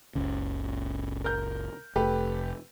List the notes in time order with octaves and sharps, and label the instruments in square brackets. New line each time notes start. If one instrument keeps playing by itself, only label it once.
[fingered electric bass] F#1 C#2 C#3
[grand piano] A#4 G6
[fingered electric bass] F1 [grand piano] A3 G4 B4